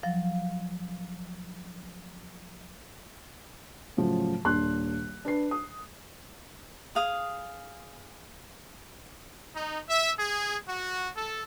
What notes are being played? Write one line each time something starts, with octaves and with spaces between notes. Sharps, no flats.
F3 F#3 F5
A2 C#3 F3 F#3
D#1 A#3 D4 C6 F#6
D4 B4 C7
D#6
G#4 F5 D#6
D#4
E5
G#4
F#4
A4